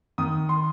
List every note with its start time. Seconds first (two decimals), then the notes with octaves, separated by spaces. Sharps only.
0.18 D#3 D#6
0.49 C6